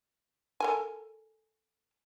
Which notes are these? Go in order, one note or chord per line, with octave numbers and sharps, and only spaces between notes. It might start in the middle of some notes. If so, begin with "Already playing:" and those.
A4 A#4 G#5